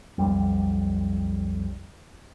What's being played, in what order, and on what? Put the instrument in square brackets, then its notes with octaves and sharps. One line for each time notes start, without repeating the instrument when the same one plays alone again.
[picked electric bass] B1 F2 G3